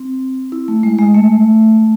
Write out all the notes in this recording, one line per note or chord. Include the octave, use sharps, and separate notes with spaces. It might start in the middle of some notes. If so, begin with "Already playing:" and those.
Already playing: C4
E4
A3
G#3
G#3
A3